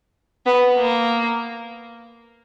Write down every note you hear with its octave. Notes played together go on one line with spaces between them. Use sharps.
B3
A#3